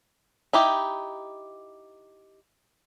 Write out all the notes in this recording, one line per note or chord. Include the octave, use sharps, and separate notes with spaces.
D#4 E4 G4